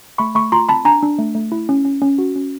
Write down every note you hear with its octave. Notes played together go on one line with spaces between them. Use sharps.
A3 B5 C#6
A3 B5 C#6
F4 A#5 C6
C4 A5 B5
D4 G#5 A#5
D4
A3
A3
E4
C#4
C#4
C#4
F#4
C#4